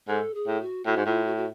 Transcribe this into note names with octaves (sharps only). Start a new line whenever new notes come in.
G#2 A4
G#4
A2
F#4
A2 F#4
G#2
A2 F4
F#4
F#4